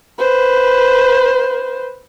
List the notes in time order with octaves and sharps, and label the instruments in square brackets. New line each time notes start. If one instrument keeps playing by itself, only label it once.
[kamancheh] B4 C5